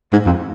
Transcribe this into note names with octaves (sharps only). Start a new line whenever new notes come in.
G#2
F2